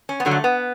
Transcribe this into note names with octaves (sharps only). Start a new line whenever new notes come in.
C#4
B3
G2 D3 F#3
A3
B3